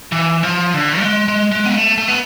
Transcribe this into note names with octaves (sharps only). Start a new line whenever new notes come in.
E3
F3
D3
A3
G#3
G#3
G#3
B3
A3
A3
B3